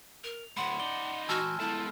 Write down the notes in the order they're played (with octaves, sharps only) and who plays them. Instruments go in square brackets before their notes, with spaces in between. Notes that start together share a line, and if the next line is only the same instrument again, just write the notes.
[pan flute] A#4 [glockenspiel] F7
[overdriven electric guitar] D2 A2 [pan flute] F#5 [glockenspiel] B5 C6
[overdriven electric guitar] D#4 D5 [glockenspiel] G7
[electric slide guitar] E3 G#5 A5 [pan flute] F#4 [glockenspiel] E6 F6
[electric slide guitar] G#3 B3 A4 [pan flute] E4 [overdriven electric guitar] F4 A5